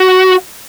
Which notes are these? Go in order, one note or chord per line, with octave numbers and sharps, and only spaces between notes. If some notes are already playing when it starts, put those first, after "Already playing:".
Already playing: F#4